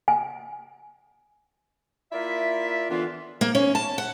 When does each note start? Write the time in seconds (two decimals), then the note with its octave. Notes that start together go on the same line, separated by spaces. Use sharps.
0.08 G#5
2.12 A#3 E4 F4 D5 E5
2.90 A2 D3 E3 B3 D4 F4
3.41 A#3
3.55 C#4
3.75 A5
3.98 F#5